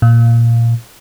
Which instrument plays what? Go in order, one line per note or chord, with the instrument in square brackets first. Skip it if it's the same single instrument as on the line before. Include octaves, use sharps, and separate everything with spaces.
[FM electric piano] A#2